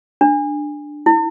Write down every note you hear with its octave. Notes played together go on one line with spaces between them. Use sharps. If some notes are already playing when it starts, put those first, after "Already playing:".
D4
E4